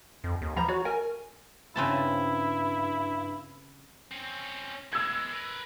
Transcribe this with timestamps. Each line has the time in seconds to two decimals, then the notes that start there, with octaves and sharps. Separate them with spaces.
0.24 F2
0.42 D#2
0.56 F3 C5 A#5 B5
0.68 F#4 C#5
0.85 A#4 G#5
1.76 G2 C#3 C4 E4 A5
4.11 C4 C#4
4.93 B2 G#3 E6 G#6
5.33 A#4 B4